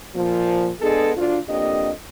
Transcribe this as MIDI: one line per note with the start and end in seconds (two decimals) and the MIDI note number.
0.15 0.71 46
0.15 0.71 53
0.81 1.11 56
0.81 1.11 59
0.81 1.11 62
0.81 1.11 68
0.81 1.11 69
1.16 1.37 38
1.16 1.37 62
1.16 1.37 65
1.48 1.90 41
1.48 1.90 58
1.48 1.90 62
1.48 1.90 67
1.48 1.90 75